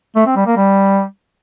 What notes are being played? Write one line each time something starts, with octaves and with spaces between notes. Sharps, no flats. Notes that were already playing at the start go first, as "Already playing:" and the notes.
A3
C4
G3
A#3
G3